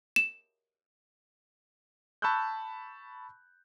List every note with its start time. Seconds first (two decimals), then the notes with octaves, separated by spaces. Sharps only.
0.16 E7
2.22 A5 B5 C#6 E6 F#6 G6